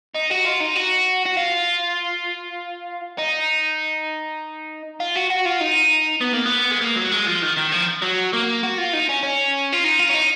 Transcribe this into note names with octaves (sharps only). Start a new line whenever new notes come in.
D#4
F#4
F4
D#4
F#4
F#4
F4
D#4
F4
F#4
F#4
F4
D#4
B3
A#3
B3
G#3
A#3
F#3
G#3
F3
D#3
D#3
F3
F#3
A#3
F#4
F4
D#4
C#4
C#4
F4
D#4
F4
C#4
D#4